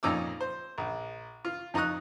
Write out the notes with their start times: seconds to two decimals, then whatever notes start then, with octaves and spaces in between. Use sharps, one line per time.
0.03 F2 A#2 C#4 D#4 D6 E6
0.41 C5
0.78 A#1
1.45 F4
1.74 F2 D#4 A#5 C#6 D#6 F#6